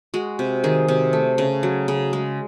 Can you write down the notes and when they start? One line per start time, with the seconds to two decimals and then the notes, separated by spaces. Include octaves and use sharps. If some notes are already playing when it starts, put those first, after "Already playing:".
0.14 G#3 F#4
0.39 C3
0.64 D#3 G#4
0.88 C3
1.13 A3
1.38 C#3
1.63 F#3
1.88 C#3
2.13 G#3